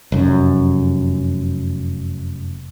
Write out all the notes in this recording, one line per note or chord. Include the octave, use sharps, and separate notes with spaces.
F1 F#2